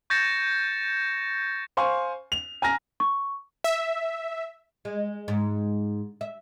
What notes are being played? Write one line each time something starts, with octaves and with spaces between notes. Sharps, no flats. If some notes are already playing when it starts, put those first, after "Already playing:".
C#6 G6 A6 A#6 C#7 E7
C5 F5 G#5 C6 C#6
F7
G#5 A#5 F6 A#6
C#6
E5
G#3
G#2
E5